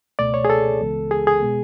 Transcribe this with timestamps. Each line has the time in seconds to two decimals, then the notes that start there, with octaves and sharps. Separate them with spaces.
0.19 C#2 B2 A3 D5
0.34 C#5
0.45 G#4
0.50 A4
0.80 C#2 C#3 E3 G#3 B3
1.11 G#4
1.27 G#4
1.42 B2 G#3 B3